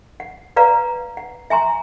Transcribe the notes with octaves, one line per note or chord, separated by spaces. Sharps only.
F#5
B4 D5 F5 F#5 A#5
F#5
E5 G#5 A#5 C6